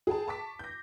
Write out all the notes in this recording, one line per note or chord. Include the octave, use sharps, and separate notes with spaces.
G#4 A4 G5 A5
A5 C#6 D6 B6
G6 A#6